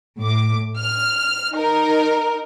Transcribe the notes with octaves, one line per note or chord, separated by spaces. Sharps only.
A2 D6
F6
D#4 A#4